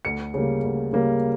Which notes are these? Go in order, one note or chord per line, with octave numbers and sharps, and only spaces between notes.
D2 C#7
C#3 G3 A#3
D2
C#3 G3 A#3